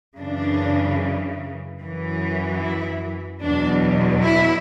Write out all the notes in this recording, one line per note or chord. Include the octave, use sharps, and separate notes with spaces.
F#2 C#3 E3 D4
F#2 E3
E4
E2 B2 F#3 D4
E4